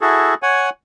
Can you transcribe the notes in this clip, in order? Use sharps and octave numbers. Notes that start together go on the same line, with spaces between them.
E4 F#4 G#4 A4
C#5 F#5 G#5